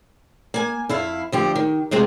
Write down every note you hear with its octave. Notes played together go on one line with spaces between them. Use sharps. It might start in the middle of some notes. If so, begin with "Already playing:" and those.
A#3 G#5
F2 E4 F5
D2 F3 G4
D#3
C3 G#3 C4 F4